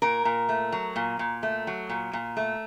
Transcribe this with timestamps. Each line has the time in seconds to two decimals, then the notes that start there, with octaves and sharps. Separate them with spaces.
0.02 A#2 A#4
0.25 A#2
0.49 A3
0.72 F#3
0.96 A#2
1.19 A#2
1.43 A3
1.67 F#3
1.90 A#2
2.13 A#2
2.37 A3